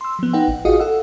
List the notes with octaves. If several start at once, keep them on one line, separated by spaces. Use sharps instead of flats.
C6 E6
F3 B3
D#4 B4 F#5 G5
A1
F4 F#4 G#4 D#5 F5 D#6
A4 F#5 E6